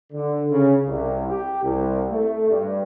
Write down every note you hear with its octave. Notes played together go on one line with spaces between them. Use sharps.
D3
C#3
C2
G4
C2
A3
G2